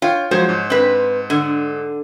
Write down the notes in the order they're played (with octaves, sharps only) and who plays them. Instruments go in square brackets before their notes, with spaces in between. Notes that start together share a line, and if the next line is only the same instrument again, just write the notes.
[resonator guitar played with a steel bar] F4 [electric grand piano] C#5 G5
[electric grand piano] F3 F#3 G#3 [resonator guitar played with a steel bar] C5 C#5
[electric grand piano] G#2
[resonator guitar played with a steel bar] C4 B4
D3